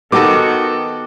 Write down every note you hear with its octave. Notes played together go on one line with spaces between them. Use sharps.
D#3 B3 F#4 G4 A4 D#5 D6